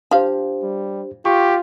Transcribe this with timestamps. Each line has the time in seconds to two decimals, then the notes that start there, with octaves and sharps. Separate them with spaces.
0.11 F3 D4 G4 C5 F5
0.63 G3
1.26 F4 G4 C#6